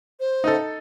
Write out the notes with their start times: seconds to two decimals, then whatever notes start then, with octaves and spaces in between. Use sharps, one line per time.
0.20 C5
0.44 D#4 A4